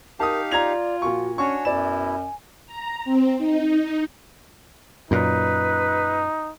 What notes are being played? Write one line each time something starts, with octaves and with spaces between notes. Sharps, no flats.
D#4 G4 A#4 F5 A5 D#6
F4 D5 A#5 G#6 F7
A#2 F3 F#4 C#6
C#4 D4 F#4 C#5 G#5 C#6
F#2 B2 E4 D5 E7
A#5
C4
D#4
F#2 A#2 D#4 B4